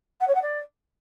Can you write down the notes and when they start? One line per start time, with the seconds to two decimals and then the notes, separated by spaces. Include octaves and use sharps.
0.21 F#5
0.28 C#5
0.35 F#5
0.42 D5